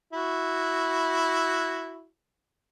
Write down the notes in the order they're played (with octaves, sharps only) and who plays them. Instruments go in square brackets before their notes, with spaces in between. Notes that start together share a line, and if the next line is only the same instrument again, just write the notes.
[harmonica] E4 F#4